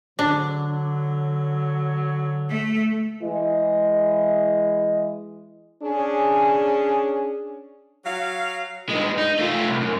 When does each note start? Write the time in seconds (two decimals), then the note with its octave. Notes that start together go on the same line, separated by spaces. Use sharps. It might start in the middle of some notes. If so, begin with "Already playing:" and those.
0.19 D3 F#3 D4
2.50 A3
3.21 E3 G#3 E4 D#5
5.83 C#4 D4 G#4
8.05 F#3 F5
8.89 G2 G#3
9.18 D#4
9.39 A3 F4
9.68 C2
9.81 F#2